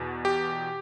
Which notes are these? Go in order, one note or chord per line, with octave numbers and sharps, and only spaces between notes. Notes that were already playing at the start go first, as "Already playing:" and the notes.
Already playing: E2 B2
G4